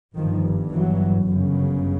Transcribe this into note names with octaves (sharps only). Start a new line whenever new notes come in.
G1 G2 D#3 F3
E3 F#3
G1 F#2 C#3